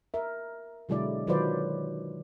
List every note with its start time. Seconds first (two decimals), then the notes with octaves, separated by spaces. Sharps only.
0.14 A#4 E5
0.89 B2 D3 F#3 G#3 E4 D5
1.27 D#3 F#3 F4 B4 C5 D5